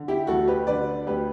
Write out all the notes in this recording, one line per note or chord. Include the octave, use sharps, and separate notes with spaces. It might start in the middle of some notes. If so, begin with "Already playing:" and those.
Already playing: D3
E4 G4
D2 F#4 A4
G4 B4
D3 B4 D5
D2 G4 B4